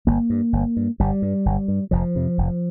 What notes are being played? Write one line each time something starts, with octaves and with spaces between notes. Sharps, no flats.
G1 A#3
G2
G1
G2
G1 G3
G2
G1
G2
F1 F3
F2 C3
F1